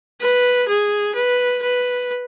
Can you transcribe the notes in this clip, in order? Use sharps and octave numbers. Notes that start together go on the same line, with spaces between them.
B4
G#4
B4
B4